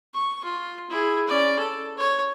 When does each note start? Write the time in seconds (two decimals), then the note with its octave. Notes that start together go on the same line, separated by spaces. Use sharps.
0.14 C#6
0.44 F4
0.90 E4 G#4
1.27 C#4 D5
1.59 A4
1.98 C#5